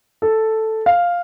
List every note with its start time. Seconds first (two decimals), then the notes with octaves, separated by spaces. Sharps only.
0.22 A4
0.86 F5